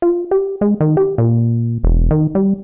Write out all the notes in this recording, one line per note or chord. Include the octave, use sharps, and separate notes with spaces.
F4
G4
G#3
D#3
G4
A#2
E1
D#3
G3